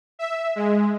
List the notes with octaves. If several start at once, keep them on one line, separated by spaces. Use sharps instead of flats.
E5
G#3